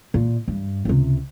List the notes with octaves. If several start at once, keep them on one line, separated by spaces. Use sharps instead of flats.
A#2
G2
C#2 C3